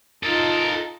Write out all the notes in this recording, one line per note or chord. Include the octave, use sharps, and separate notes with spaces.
D#4 F4 A4 A#4